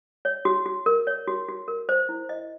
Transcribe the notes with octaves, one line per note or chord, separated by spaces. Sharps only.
C#5
F#4
F#4
A#4
C#5
F#4
F#4
A#4
C5
E4
D#5